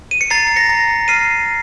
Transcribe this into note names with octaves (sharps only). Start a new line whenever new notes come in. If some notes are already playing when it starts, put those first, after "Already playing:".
D#7
C#7
A#5 A6 C7
A#6 C#7
A#5
F6 C7 D#7